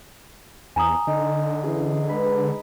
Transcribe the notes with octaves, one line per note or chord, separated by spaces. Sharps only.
E2 G#5 A#5 D#6
D3 D#4
E3 C#4 G#4
G#3 B4 B5